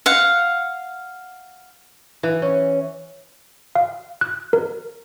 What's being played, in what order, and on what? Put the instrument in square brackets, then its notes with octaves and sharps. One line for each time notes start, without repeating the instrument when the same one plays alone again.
[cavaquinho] F5 F#5
[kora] E3
C#4
[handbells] F5
F#6
A#4